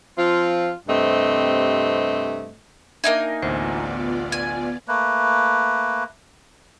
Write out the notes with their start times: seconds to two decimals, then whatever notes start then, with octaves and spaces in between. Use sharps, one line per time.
0.18 F3 C4 F4
0.88 G2 C3 A3 C4 D#5
3.04 A#3 D4 D#4 A#4 E5 G#5
3.42 A1 D2 B3 F4 C5 D5
4.32 G#5
4.88 A3 A#3 B4